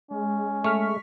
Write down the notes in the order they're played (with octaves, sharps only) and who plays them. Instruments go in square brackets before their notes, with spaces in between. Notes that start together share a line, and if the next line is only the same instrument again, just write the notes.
[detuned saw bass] G#3 [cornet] C#4
[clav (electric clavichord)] A3 [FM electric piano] C#6 F6 B6